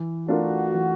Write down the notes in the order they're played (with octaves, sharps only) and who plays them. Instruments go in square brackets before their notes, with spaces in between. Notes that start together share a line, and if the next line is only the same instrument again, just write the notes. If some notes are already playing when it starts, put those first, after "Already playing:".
Already playing: [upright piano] E3
[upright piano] A3 D4 F4 A#4 [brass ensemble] F#4
[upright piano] E3